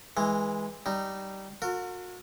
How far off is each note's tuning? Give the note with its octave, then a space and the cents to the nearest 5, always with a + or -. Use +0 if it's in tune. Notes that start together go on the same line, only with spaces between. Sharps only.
E3 -15 G#3 +0
G3 -15 D#4 -15
F#4 -35 A#4 -40